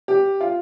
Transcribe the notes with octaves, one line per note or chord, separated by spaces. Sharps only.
G4
F4